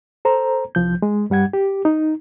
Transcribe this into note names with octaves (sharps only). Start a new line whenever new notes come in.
A4 C5 A#5
C2 F3 G6
G#3
G2 G3 F#5 G#6
G4
D#4